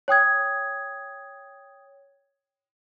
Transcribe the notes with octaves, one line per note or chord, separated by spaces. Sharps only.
C#5 G5 D#6 G#6